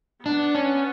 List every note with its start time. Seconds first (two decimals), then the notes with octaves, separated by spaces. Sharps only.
0.25 B3 D4
0.55 C#4